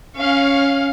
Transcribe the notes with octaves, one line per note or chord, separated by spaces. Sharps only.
C#4 F5